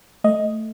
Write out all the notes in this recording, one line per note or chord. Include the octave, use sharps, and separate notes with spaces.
A3 D#5